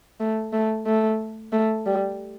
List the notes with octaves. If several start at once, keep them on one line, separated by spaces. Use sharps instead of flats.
A3
A3
A3
A3
G3